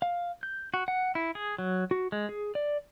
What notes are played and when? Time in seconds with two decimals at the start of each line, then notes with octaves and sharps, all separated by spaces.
0.02 F5
0.43 G6
0.74 F#4
0.88 F#5
1.15 E4
1.35 G#4
1.58 F#3
1.91 F#4
2.12 G#3
2.29 G#4
2.55 D5